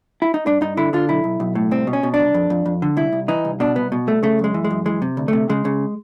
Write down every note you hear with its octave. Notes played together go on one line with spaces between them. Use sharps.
E4
D#4
G2 D4
G2 D#4
D3 E4
D3 F4
B1 E4
B1
B1
A2
C2 C4
B2
C#4
B2
D4
C2
F2
F2
F2
D3
C2 E4
C2
E3 D#4
C2
B2 D4
C2 B3
B2
C2 A3
C#3 A3
F#2 G#3
E3
G#3
F#2
E3 G#3
C3
D2
C3 A3
C#3 G#3
C#3